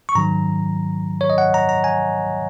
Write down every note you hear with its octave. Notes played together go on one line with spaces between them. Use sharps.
C#6
G#2 D#3 F#3 A#5
C#5
D#5
F#5
A#5
A#5
G#5